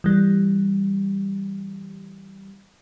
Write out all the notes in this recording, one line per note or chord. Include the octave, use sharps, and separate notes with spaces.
E3 G3